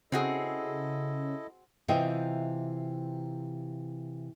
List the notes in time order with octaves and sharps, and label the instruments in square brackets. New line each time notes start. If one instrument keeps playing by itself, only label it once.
[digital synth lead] C#3 [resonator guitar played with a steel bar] C4 F#4 G#4 [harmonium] E4 A4 D#5
[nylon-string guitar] C3 E3 F4 D#5 E5 G5